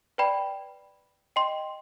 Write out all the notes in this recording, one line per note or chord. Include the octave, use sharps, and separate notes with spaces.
B4 D5 G5 B5
D#5 G5 C6